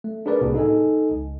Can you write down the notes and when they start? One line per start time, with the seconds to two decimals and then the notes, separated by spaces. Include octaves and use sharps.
0.04 A3
0.26 D4 G#4 A#4 B4 D5
0.41 C2 A2 C3 A#3 F#4 G#4
0.55 D#4 A4 D#5 G#5
1.11 C#2